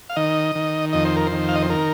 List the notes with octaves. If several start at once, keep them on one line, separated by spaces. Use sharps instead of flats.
F5
D#3 D#5
D#3
F2 D#5
C5
A#4
C5
D#3
F5
D#5
C5
D#3 A#4